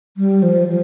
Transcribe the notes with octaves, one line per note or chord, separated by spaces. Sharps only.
G3
F3
F3